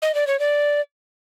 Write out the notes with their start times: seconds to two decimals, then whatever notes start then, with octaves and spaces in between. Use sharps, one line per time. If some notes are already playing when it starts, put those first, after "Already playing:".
0.02 D#5
0.15 D5
0.27 C#5
0.39 D5